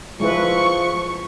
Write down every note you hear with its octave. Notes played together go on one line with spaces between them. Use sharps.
F3 G#3 E4 B4 C#6